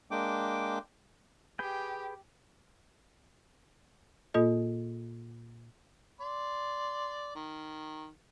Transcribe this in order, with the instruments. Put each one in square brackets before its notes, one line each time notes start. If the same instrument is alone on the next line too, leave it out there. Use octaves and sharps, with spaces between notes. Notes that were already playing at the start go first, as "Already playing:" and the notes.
[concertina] G#3 A#3 D4 G5 D6
[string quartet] G4 [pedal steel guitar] G#4 B4 G5
[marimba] A#2 A#3 F4 A4 D#5
[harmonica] D5 C6
D#3